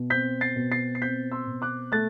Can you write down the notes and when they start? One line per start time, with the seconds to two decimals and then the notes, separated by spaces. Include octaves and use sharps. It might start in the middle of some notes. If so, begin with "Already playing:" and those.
Already playing: B2
0.10 C4 G6 B6
0.41 A6 C7
0.56 B2
0.72 A6 C7
0.95 C7
1.01 C4 G6 B6
1.32 C6 E6
1.47 B2
1.62 D6 F#6
1.92 A3 F#6 A6